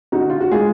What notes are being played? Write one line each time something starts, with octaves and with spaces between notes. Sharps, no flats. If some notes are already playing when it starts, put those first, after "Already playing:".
D3 D#4 F#4
F4
F#4
G#3 F4 G#4